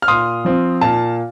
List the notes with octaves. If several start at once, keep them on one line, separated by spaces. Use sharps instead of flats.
F6
A#2 C6 D#6
F3 C4
A#2 F5 A5